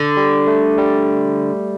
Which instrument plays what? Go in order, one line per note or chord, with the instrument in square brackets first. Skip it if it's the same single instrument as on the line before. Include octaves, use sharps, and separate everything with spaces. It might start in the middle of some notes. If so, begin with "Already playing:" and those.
Already playing: [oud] D3
[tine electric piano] G3
A3
G3